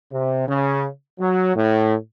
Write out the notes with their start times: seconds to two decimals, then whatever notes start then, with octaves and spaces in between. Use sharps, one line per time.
0.12 C3
0.48 C#3
1.19 F#3
1.55 A2